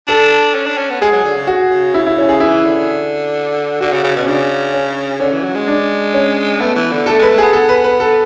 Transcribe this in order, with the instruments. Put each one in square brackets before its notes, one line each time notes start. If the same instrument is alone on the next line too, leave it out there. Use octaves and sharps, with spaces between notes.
[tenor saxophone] D4 [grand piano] A4
[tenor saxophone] C#4
D4
C#4
B3
[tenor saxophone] G#3 [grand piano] G#4
[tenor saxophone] F#3
D3
C#3
[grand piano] F#4
[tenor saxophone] C#3
[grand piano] E4
E4
C#4
G#4
[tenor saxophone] E3 [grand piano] E4
[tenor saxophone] D3
[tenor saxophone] D3 [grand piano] F#4
[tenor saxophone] C#3
C#3
[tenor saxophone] B2 [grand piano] C#4
[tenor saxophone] C#3 [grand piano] D4
[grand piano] C#4
[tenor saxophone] D3 [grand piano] C#4
[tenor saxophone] E3
F#3
G#3
[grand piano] D4
C#4
[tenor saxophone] A3 [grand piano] B3
[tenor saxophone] E3
D3
[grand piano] A4
[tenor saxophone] A3
[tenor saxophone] G#3 [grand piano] B4
[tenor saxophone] A3
[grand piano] G#4
[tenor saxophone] B3
[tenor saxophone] B3 [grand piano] A4
[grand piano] B4
B4
A4